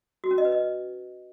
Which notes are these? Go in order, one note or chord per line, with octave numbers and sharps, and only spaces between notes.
F#4
C#4
D#5
B4
D#5